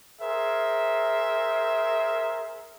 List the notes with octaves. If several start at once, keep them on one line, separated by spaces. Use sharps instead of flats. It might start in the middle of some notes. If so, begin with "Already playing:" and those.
G#4 A#4 C5 E5